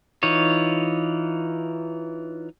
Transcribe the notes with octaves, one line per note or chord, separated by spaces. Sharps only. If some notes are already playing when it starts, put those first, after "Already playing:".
E3 D#4 F4 C#5